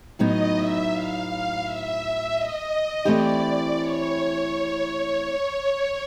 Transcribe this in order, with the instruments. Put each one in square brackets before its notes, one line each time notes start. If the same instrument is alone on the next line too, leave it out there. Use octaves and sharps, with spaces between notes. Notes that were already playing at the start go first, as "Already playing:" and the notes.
[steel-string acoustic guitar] A2 F#3 B3 D#4 [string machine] D#5
[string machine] E5
F5
F5
E5
D#5
[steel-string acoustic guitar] E3 A3 C4 E4 G4 [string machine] D5
[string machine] C#5